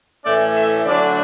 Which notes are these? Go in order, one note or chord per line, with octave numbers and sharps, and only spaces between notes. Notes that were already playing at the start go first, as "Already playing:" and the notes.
A2 E3 A3 C#4 D5
E5
D3 F#3 A3 D4 D5